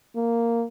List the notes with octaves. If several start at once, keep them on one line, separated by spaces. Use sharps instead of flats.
A#3